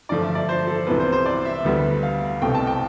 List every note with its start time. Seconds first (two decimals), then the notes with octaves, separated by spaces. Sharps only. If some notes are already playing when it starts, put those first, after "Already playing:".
0.09 G2 D3 F3 A3 D5
0.22 E5
0.35 D5
0.49 C5
0.67 A4
0.87 C2 C3 E3 B3 B4
1.00 C5
1.12 C5
1.26 D5
1.45 E5
1.65 D2 D3 G3 B3
2.03 F5
2.41 C2 B2 A3 C4 G5
2.55 A5
2.67 G5